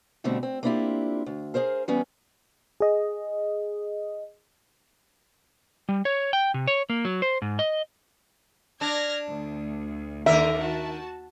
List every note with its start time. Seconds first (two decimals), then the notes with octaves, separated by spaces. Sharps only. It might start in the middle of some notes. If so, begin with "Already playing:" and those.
0.24 B2 D3 G3 A3 C4 D4
0.43 C4
0.63 A#3 C4 D4 E4 F4 G4
1.26 D2
1.54 G#4 A#4 C5 F5
1.88 E3 G3 B3 C#4
2.80 G#4 D#5
5.89 G3
6.05 C#5
6.33 G5
6.54 C3
6.68 C#5
6.90 A#3
7.05 F#3
7.22 C5
7.42 G#2
7.59 D#5
8.81 D4 F6 G#6 A#6
9.29 D2
10.26 D#2 D3 D#3 A#4 E5
10.59 F#4 A5